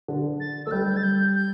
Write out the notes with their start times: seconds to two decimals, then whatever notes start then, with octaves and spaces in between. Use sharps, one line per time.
0.08 D3
0.40 A6
0.66 A3 E6
0.71 G3 G6
0.96 A6
1.03 G6
1.36 G6